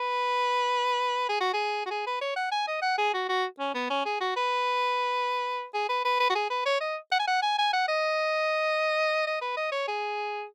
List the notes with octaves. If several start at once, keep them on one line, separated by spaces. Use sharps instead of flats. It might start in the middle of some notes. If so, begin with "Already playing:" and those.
Already playing: B4
G#4
F#4
G#4
F#4
G#4
B4
C#5
F#5
G#5
D#5
F#5
G#4
F#4
F#4
C#4
B3
C#4
G#4
F#4
B4
G#4
B4
B4
B4
F#4
G#4
B4
C#5
D#5
F#5
G#5
F#5
G#5
G#5
F#5
D#5
D#5
B4
D#5
C#5
G#4